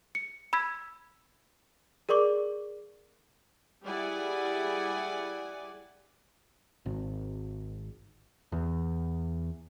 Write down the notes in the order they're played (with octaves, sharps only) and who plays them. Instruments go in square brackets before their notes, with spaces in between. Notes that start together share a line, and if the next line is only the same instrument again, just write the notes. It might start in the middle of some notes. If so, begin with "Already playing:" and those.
[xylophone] C#7
B5 E6 G#6 B6
G#4 A#4 D5 C#6 D6
[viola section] G3 E4 G#4 D5 F#5 G#5
[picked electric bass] G#1
E2